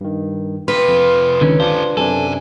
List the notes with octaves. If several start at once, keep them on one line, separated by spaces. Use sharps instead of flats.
G2 D#3
C3 F4 B4
F2
C#2 D3 D#3 C#4
D4 F4 G4 A4 C5
F#2 C3 D4 D#4 A4 G#5